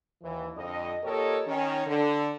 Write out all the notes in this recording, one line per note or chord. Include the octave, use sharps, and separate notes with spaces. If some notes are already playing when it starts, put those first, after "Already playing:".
D#2 E3
F2 D3 D#5
A#2 G4 A4 A#4 C#5 D#5
D#3 C#4
D3